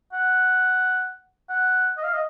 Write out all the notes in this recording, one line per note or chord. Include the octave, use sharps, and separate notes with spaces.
F#5
F#5
D#5
F5
D#5